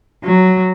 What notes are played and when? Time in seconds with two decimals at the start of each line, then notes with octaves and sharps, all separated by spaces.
0.22 F#3